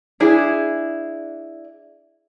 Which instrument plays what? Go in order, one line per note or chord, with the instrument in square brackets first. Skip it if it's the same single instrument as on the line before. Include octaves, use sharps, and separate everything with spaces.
[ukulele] D4 E4 G#4